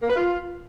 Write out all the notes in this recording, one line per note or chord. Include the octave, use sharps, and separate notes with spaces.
A#3
B4
F4